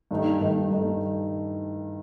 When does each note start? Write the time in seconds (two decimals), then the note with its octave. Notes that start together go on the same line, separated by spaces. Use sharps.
0.11 G2 D#3 A3 D#4
0.41 G2 D#3 A3 D#4
0.71 G2 D#3 A3 D#4